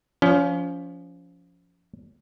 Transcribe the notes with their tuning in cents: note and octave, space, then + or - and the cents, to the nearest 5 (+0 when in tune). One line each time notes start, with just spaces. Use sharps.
F3 +0 C#4 +30